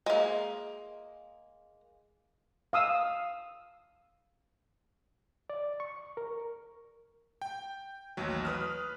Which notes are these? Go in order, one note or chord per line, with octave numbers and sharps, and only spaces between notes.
G#3 A#3
F5 D#6 E6
D5
C#6
A#4
G5
A1 D#2 F#3
B4 D#6 F6